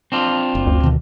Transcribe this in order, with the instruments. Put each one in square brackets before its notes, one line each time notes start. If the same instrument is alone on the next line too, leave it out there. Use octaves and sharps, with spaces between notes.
[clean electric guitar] C4 D4 F4
[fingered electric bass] F#1
[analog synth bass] D2
[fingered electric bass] B2 D3 D#3